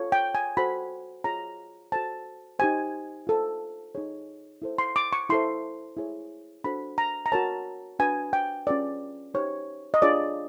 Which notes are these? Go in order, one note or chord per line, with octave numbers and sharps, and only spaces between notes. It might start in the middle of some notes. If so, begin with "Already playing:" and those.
Already playing: F4 A4 C#5
G5
G#5
F#4 A4 C5 B5
F4 G#4 C#5 A#5
F#4 A4 C5 A5
D#4 G4 C5 G#5
F4 A4 C5
D#4 G#4 C#5
E4 A4 C5
C6
D6
C#6
E4 A4 C5 C6
E4 G#4 C#5
D4 F#4 A4 C5 B5
A#5
A#5
F#4 A#4 C#5 A5
D4 F#4 B4 G#5
G5
C#4 F4 G#4 B4 D5
D#4 G4 C5 C#5
D#5
D4 F4 G#4 C#5 D5